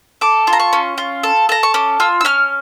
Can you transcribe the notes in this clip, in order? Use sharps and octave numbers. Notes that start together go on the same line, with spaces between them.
A4 D6
F4
A#5
C#6
C#4
F4
A4
A4 A#5
C#6
C#4 D6
F4 E6
E6
C#4 F6